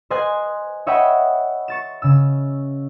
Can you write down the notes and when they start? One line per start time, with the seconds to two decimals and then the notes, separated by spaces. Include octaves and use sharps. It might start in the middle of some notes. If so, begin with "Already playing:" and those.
0.10 C5 D#5 G#5 C6 F#6 G#6
0.87 C#5 D#5 E5 F#5 G5 B5
1.68 C#6 A6 E7
2.02 C#3 E6